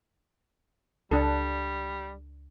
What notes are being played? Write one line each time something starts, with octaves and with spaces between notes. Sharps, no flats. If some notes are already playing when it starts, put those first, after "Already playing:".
C#2 G3 D4 A4